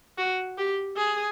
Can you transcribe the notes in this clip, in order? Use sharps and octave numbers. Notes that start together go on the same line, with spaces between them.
F#4
G4
G#4